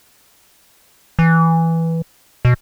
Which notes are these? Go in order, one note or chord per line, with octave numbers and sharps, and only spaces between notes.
E3
B2